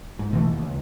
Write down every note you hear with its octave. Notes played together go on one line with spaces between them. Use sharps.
G#2
F1 B2 E3 A3
D#2
C#2